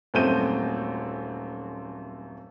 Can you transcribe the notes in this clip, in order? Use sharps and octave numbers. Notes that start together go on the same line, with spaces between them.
D#1 F#2 A3 C4 G6 D#7